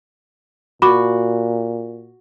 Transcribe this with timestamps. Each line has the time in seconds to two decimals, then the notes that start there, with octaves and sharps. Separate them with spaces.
0.82 A#2 F#4 B5 D6